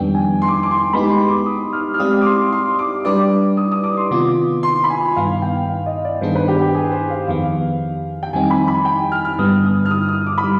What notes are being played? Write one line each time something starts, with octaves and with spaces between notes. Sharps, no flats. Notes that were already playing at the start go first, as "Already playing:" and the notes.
Already playing: F2 D#3 G3 B3 D4 G5
G#5
C6
D6
C6
D6
C6
G#3 B3 D#4 G4 B5
C6
D6
D#6
F6
F6
G#3 C4 G4 D5 F5 D#6
D6
C6
C6
D6
G3 D4 G4 B4 D5 D6
D#6
D#6
D6
C6
C3 D#3 B3 F4 D6
C6
B5
G#5
G2 D#3 B3 F5
G5
F5
D#5
D5
G2 D#3 B3 D4 G#4 C5
B4
G4
G4
G#4
C5
F5
F2 D#3 B3 F5
G5
F2 D#3 G3 C4 D#4 G#5
B5
B5
G5
F6
F6
G2 D3 G3 B3 D#6
D#6
F6
D#6
D#6
D6
B5
G3